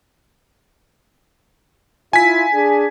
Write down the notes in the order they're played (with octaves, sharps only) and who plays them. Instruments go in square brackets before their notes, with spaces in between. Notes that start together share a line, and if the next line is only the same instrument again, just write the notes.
[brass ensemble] E4 F4 [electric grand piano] G#5 B6
[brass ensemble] D4 G#4